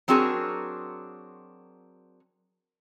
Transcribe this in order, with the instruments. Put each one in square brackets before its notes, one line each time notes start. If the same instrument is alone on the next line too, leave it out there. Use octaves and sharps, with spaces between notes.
[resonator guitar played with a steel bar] F#3 C4 D4 F#4 G#4 A#4